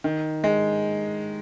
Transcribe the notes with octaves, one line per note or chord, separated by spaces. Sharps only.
D#3
G#3